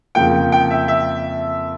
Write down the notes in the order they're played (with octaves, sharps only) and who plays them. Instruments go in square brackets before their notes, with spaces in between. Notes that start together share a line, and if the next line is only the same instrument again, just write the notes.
[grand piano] F2 C#3 F3 A#3 [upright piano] G5
[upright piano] G5
E5
E5